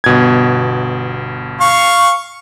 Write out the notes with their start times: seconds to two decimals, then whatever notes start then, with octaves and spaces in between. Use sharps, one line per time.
0.04 G1 B2 G#6
1.60 F5 C#6